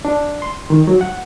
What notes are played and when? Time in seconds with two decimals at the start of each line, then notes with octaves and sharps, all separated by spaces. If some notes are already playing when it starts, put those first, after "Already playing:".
0.05 D4
0.42 C6
0.70 D#3
0.87 F#3
1.01 F#5